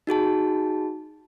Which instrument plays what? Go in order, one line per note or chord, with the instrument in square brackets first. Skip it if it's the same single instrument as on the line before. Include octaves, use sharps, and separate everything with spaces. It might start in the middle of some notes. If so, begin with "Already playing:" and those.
[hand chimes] D#4 F#4 G#4 A5